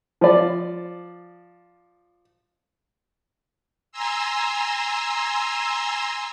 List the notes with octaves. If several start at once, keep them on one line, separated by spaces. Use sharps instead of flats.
F3 D5
G#5 A#5 C6 E6